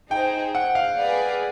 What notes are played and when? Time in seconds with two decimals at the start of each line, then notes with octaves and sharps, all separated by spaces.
0.11 D#4 G#4 C5 G5
0.55 F#5
0.75 F5
0.97 G#4 B4 D5